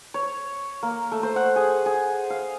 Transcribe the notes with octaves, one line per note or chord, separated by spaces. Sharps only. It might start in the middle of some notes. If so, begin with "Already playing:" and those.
C#5
A#3
A3
C5
F#5
G#4
G#4
F5